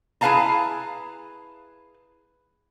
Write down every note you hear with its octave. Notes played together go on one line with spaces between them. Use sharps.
E4 G#4 B4 F5 A5 A#5